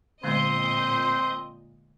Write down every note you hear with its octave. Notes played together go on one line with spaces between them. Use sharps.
A#2 D3 G#3 B3 C4 C5 D#5 G6